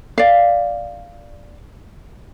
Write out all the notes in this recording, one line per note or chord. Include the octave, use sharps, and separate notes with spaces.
D5 F5